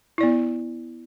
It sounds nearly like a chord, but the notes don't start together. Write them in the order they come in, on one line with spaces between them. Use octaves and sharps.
E4 D5 B3